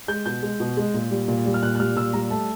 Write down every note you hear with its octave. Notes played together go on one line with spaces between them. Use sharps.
G#3 G6
B2 G6
G#3
B2
G#3
A#2
G3
A#2
G3
F6
A#2 F#6
F#6
G3 F6
A#2 E6
G3 A#5
A3 A5